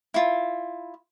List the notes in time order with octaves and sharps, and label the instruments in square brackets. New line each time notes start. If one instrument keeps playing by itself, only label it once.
[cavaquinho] E4 F4